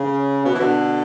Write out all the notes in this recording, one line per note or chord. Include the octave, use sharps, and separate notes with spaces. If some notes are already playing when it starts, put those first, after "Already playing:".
Already playing: C#3
B2
E3
B2 D3